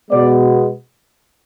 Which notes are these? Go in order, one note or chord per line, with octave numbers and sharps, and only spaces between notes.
B2 G#3 B3 D5